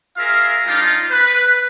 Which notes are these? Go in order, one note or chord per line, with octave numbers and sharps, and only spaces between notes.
F4 G#4 A#4 E5 F5
G3 D4 D#4 F4
B4